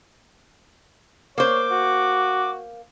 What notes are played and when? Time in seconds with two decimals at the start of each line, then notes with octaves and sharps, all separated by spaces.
1.38 A#3 C5 C#5 D6
1.71 F#4